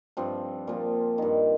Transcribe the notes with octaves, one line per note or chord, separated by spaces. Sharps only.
G2 F3 C4
A#2 F3
G2 D#3